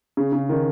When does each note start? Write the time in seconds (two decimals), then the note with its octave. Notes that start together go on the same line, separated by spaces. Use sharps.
0.17 C#3
0.33 C#3
0.49 D#3